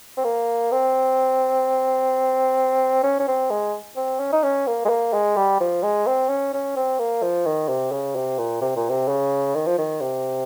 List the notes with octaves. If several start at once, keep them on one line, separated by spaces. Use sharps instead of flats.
C4
A#3
C4
C#4
C#4
C4
G#3
C4
C#4
D#4
C#4
A#3
G#3
A#3
G#3
G3
F3
G#3
C4
C#4
C#4
C4
A#3
F3
D#3
C3
C#3
C3
A#2
C3
A#2
C3
C#3
D#3
F3
D#3
C3